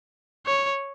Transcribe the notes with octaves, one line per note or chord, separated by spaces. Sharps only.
C#5